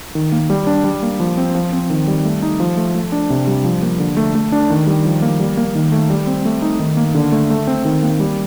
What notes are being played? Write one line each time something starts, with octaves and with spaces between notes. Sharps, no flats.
D#3
A#3
G3
D4
G3
A#3
F3
C4
F3
C4
D#3
G3
A3
D#4
F3
A3
A3
D4
C3
G3
F3
A#3
D3
A3
A3
D4
D#3
G3
F3
A#3
G3
A#3
D#3
A3
G3
C4
A3
D#4
D#3
A#3
D3
A3
A3
C4
D#3
A#3
G3